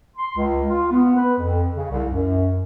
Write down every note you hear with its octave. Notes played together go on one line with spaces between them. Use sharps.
C6
C#2
F4
B3
B4
F2
C#3
C2
F#2